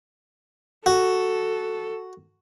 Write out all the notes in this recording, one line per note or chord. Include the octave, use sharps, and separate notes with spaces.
F#4 A4